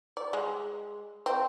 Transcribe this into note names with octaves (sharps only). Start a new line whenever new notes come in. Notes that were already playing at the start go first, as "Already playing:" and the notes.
D5
G#3
C4